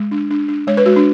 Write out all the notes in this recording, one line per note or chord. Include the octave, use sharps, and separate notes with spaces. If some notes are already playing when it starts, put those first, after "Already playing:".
Already playing: G#3
D4
D4
D4
G#3 C#5
B4
G#3 F#4
D4